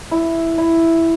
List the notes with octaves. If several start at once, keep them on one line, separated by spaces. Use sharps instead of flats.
E4
E4